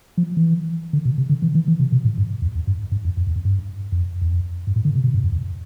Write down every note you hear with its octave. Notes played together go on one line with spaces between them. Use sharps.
F3
E3
D3
B2
C3
D3
E3
E3
E3
C3
B2
A2
G2
E2
E2
G2
G2
F2
F2
E2
F2
G2
F2
E2
F2
G2
A2
D3
C3
B2
G2
F2
E2